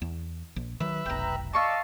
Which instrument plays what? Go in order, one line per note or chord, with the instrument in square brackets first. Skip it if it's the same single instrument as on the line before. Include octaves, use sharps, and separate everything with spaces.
[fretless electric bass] E2
A#1
[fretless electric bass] D#3 F#3 [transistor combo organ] B4 E5
[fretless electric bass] F1 B1 [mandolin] G5 A#5
[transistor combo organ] D5 [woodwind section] D#5 F5 A5 [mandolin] C6 C#6 E6